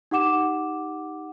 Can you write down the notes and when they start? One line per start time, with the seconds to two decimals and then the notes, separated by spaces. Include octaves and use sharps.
0.11 D#4 G4 F#5 D6 E7